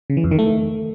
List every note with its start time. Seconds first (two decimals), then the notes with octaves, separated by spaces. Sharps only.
0.10 C#3
0.17 E3
0.24 F2
0.31 D#3
0.39 A3